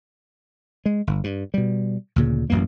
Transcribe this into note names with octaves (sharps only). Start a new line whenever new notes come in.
G#3
G1
G2
B2 G3
D2 A#2 C#3
A1 F#2 B2 A#3